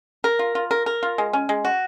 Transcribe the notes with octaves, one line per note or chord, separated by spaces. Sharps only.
A#4
F4
F4
A#4
A#4
F4
G#3
C#4
G#3
F#4